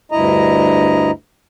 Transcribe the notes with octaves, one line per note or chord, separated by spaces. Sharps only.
D2 G2 E4 D#5 A#5